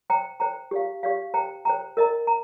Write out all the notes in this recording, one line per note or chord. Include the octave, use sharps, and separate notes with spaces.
C5 G5 A#5
C5 G5 A#5
G4 D5 F5
G4 D5 F5
C5 G5 A#5
C5 G5 A#5
A#4 D#5 A#5
A#5